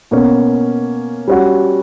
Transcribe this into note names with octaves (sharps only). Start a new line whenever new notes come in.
B2 A#3 C#4
G3 C#4 F#4